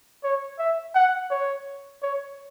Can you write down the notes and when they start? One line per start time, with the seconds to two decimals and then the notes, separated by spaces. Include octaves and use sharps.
0.24 C#5
0.59 E5
0.95 F#5
1.31 C#5
2.03 C#5